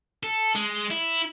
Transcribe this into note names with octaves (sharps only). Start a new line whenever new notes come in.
A4
G#3
E4